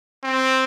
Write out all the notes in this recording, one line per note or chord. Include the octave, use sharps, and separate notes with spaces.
C4